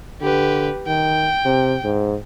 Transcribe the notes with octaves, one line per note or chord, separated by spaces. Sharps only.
D3 G4 B4
D#3 G5
C3
G#2